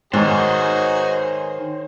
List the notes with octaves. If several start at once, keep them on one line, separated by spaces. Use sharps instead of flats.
G#2 D#3 D#4 F#4 G#4 C5 C#5